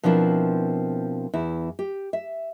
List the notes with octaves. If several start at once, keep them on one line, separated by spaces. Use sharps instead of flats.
B2 F3 C4 D4 E4 A#4
E2 E4
G4
E5